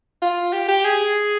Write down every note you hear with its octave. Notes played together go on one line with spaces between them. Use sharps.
F4
G4
G4
G#4